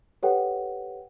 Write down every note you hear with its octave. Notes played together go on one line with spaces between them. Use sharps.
G4 A4 B4 C#5 F#5 G5